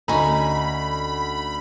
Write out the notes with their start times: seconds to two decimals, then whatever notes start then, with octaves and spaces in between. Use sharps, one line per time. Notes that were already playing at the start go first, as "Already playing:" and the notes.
0.08 D2 C#4 D#4 A#5 B5